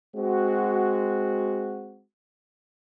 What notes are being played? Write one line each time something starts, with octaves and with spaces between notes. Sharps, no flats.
G#3 C4 F#4